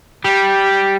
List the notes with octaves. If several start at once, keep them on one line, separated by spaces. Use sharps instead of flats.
G3